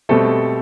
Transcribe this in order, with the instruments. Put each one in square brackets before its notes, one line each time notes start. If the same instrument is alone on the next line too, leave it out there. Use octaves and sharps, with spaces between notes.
[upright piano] B2 G3 A3 C4 A4